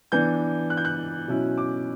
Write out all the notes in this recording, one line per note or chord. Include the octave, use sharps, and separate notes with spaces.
E3 B3 D4 G6
F#6
G6
F#6
B2 F#3 C#4 E4
D6